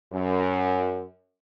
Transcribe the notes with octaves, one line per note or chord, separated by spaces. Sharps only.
F#2